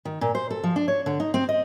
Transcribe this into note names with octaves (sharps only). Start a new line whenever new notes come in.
D#3
A#2
C5
A4
F3
D4
C#5
D3
D#4
C4
D#5